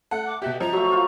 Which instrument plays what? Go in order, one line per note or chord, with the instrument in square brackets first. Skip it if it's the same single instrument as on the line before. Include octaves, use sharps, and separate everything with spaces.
[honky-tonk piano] A3 A4 F#5
[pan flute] D6
[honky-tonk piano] B2 F#4 G4 [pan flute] E5
[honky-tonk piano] F3 [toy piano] D#5 [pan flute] A#5
[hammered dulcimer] F#3 A3 [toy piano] F#4
[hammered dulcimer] F4